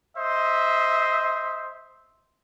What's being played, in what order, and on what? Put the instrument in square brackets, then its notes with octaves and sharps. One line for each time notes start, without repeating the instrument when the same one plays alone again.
[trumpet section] C5 D#5 E5